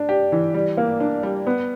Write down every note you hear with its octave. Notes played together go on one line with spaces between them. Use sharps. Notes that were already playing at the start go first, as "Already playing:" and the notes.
Already playing: D4
G4
E3
G3
A#3
D4
G3
B3